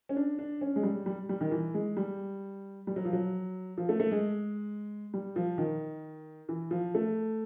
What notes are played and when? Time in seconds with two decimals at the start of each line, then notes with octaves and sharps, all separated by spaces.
0.09 C#4
0.16 D4
0.39 D4
0.61 C#4
0.76 G#3
0.83 G3
1.06 G3
1.29 G3
1.41 D#3
1.51 E3
1.74 G#3
1.97 G3
2.87 G3
2.96 F#3
3.05 F3
3.13 F#3
3.77 F3
3.89 A3
4.00 A3
4.11 G#3
5.14 G3
5.36 F3
5.58 D#3
6.49 E3
6.71 F3
6.94 A3